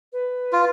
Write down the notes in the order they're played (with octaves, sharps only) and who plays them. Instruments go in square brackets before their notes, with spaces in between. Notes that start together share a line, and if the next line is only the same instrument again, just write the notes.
[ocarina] B4
[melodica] F4